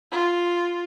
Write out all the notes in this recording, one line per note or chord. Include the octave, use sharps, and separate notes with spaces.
F4